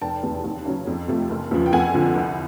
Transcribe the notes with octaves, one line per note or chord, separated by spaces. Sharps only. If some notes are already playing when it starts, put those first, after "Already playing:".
F1 G5 A5
E2 C3
D#2
C#3 F#3
F2
C3 F3 A3
F#1
E2 C#3 F3
G5
F2 F#5 G#5
D3 F3
C2